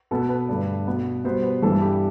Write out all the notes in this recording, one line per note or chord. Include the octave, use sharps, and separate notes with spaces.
B2 B3 A4
B4
G2 D3 A3
B2 B3
B2 G3 B3 C5
B4
G2 E3 G3 B3 A4
G4